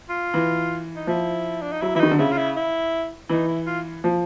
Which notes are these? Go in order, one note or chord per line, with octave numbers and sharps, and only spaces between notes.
F4
E3
D#4
F3 E4
D4
D#4
F#3 E4
E3 E4
D#3 D#4
D3
C#3 E4
F4
E4
E4
E3 D#4
E4
F4
F3